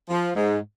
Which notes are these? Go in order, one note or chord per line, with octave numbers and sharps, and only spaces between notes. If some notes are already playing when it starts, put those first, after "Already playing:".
F3
G#2